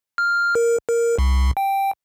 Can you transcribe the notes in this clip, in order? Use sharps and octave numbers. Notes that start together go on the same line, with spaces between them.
F6
A#4
A#4
C2
G5